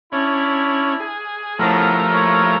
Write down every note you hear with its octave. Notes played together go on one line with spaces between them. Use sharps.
C#4 D4 E4
G#4
A2 C#3 F3 A3 B3 A#4
A#3 E4 C#5